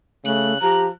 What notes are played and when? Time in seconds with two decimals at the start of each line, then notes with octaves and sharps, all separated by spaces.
0.25 C#3 A3 F#6
0.62 F3 G4 A#5